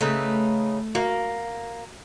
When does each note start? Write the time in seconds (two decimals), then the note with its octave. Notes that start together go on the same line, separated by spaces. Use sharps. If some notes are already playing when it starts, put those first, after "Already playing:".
0.01 C#3 A3 D#4 B4
0.95 A#3 F#4